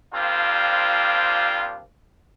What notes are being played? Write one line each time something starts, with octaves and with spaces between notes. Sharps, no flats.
F3 G3 A#3 C4 D4 F4